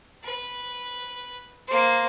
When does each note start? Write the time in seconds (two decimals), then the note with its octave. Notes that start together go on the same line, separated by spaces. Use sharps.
0.23 B4
1.67 A#3 C5